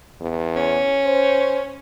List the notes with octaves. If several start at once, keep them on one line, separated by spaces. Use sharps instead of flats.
E2
C#4
C5